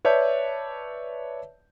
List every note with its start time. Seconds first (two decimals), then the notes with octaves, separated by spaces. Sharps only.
0.05 B4 C#5 D5 E5 A5 G6